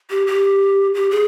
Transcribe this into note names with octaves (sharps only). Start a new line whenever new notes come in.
G4
G4
G4
G#4